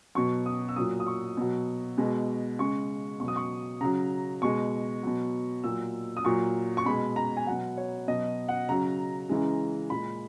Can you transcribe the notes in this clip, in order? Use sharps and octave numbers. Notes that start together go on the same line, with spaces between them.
B2 F#3 C#6
D#6
E6
A#2 F#3 D#6
D#6
C#6
B2 F#3
B2 G#3
C#3 G#3 C#6
B2 F#3 C#6
D#6
C#6
C#3 F#3 A#5
B2 G#3 C#6
B2 F#3
A#2 F#3 E6
D#6
A#2 F#3 C#6
C#6
B2 G#3 B5
A#5
G#5
B2 F#3 F#5
C#5
B2 F#3 D#5
F#5
C#3 F#3 A#5
C#3 E3 G#3
A#2 G#3 B5